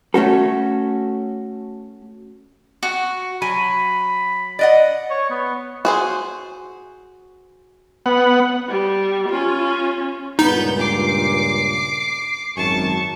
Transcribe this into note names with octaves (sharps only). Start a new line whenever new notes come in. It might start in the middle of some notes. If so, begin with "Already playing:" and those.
A3 C#4 F#4 A4
F#4
F#3 G#5 B5
D5 D#5 F#5
C#5
B3
F#4 G#4 C5
B3 F#5
G3
C#4 F4
C#2 G2 A#2 B3 D#4 G6
D6 C7
G#1 F#2 A5 C#6